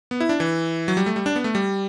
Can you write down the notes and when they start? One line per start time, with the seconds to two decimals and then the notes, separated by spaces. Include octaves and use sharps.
0.11 B3
0.20 E4
0.29 D4
0.40 E3
0.88 F#3
0.97 G3
1.06 A3
1.16 G3
1.26 D4
1.36 B3
1.44 A3
1.55 G3